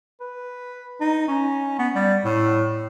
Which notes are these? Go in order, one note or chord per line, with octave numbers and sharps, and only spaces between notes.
B4
D#4
C#4
B3
G3
A2